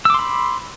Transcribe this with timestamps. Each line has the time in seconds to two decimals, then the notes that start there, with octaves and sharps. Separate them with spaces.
0.05 E6
0.10 D6
0.14 C6
0.19 B5